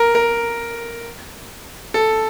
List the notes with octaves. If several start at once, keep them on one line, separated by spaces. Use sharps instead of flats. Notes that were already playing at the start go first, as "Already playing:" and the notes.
Already playing: A#4
A#4
A4